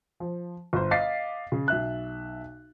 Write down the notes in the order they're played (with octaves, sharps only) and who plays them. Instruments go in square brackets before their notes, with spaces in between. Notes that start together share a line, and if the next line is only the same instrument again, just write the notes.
[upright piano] F3
G1 C5
D#5 F5 D6 A6 B6 C7
C#3
B1 E5 F#6